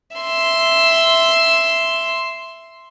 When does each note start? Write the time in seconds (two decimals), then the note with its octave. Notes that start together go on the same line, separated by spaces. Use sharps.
0.17 E5 C6